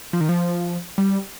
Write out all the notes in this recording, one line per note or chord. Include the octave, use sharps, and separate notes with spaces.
F3
D#3
F3
G3